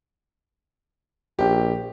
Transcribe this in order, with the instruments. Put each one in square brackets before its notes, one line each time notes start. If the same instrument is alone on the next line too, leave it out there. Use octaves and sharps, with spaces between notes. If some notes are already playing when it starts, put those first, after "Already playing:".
[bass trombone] A#1 [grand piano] G4